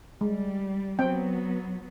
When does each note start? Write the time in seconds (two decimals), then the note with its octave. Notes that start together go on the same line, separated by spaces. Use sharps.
0.21 G3 G#3
0.99 F#3 B3 C4 G5